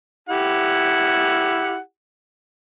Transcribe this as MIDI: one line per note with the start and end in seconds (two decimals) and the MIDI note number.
0.29 1.78 64
0.29 1.78 67
0.29 1.78 78